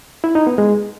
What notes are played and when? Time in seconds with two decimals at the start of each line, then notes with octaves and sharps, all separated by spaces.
0.24 E4
0.35 D#4
0.47 B3
0.58 G#3